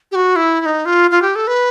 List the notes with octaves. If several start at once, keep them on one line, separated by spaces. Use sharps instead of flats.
G4
F#4
E4
E4
D#4
F4
F4
G4
A4
B4